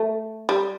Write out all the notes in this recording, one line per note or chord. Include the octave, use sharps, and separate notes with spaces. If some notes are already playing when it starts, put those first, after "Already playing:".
Already playing: A3
G3